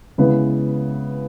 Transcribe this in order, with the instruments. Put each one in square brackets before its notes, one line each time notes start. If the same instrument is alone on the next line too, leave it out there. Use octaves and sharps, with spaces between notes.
[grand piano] C#3 G#3 B3 E4 B4